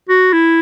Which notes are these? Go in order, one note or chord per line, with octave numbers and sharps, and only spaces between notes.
F#4
E4